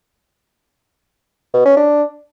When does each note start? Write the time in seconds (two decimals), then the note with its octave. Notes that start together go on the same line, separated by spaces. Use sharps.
1.54 B2
1.65 C#4
1.77 D4